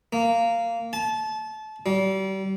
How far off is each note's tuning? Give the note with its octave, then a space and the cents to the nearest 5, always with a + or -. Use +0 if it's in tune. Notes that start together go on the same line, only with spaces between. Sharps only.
A#3 -15
A5 -25
G3 -35